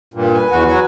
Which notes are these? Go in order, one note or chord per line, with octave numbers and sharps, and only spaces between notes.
G2 A#2
B4 G#5
E2 F#4
F#3 F#4